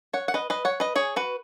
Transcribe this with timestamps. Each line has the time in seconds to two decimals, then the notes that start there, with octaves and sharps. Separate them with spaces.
0.13 C#5 F#5
0.28 F#5
0.34 B4 D#5
0.50 B4 D#5
0.65 C#5 F#5
0.80 B4 D#5
0.96 G#4 C#5
1.16 F#4 B4